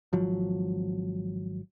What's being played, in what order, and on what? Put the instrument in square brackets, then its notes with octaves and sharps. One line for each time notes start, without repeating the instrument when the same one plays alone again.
[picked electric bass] G#1 F3 F#3